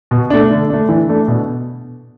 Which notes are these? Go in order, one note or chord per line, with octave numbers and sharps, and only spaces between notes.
B2
A3 D4
D3
A3 D4
E3
A3 D4
B2